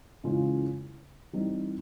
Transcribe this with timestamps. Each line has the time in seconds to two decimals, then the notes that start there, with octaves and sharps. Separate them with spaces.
0.24 C#3 E3 G#3 C#4 F4
1.33 E3 G3 C4 D#4